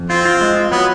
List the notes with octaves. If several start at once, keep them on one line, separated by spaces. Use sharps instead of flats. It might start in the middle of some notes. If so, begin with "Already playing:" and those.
Already playing: F2
C4 F4
F4
G#3
F4
F#3 B3